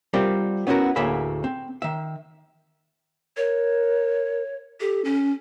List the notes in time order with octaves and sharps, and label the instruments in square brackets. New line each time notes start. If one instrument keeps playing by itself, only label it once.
[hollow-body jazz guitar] G3 C4 F4 A#4
B3 C#4 D#4 E4 F#4 A#4
D2 A2 A#3 G#4 E5 B5
C4
D#3 E5
[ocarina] A#4 [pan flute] C#5
[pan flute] G4 [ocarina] A4
[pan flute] C#4